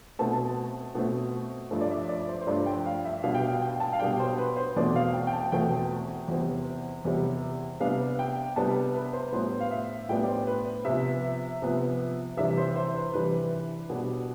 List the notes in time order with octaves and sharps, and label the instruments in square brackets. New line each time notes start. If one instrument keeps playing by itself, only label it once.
[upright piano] B2 A3 C4 A5
A5
B2 A3 C4
G2 F3 A3 D4
D5
E5
D5
C5
C5
G2 F3 A3 D4 D5
G5
F5
E5
B2 G3 D4 F5
G5
F5
G5
A5
F5
B2 G3 D4 G5
C5
B4
C5
E2 B2 A3 C4 D5
F5
G5
G5
A5
E2 B2 A3 C4 G5
E2 C3 G3 C4
E2 C3 G3 C4
C3 G3 B3 D4 F5
G5
C3 G3 B3 D4 A5
B4
C5
A2 G3 B3 D4 C5
F5
E5
A2 G3 B3 D4 G5
D5
C5
B4
C3 F3 B3 E5
C3 F3 B3
C3 E3 G3 D4 E5
C5
C5
B4
C3 E3 G3 D4 B4
B2 G3 D4